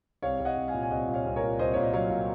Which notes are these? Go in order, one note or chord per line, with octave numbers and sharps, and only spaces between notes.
C2 C#5 F5
C2
D#5 F#5
C2
F5 G#5
A#2
G#5
C2 D#5 F#5
A#2
C#5 F5
C2
A#4 C#5
A#2
C2 C5 D#5
A#2 C#5
D#5
F#3 C#5 F5
A#2